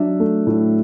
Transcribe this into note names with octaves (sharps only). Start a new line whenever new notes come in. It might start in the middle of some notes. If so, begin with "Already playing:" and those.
Already playing: F#3 D4 E5
A3
A2